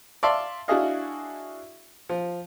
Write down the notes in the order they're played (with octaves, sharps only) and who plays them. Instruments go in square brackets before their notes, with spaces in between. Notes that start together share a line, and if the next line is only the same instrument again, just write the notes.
[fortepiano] D5 E5 F5 A5 C6
D4 E4 F#4 G#4 D#5 F5
F3